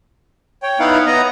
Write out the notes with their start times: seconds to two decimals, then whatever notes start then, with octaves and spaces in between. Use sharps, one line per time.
0.63 C#5 G5
0.79 B3 D#4 E4 F5 F#5
1.06 B3 D#5 A#5